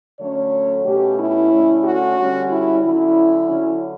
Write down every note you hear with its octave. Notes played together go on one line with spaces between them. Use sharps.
D3 F#3 A3 C#4 C#5
B2 A3 C#4 G4
E4
D3 A3 C#4
F#4
D3 G3 C#4
E4
D3 F#3 C#4 E4
D3 F#3 C#4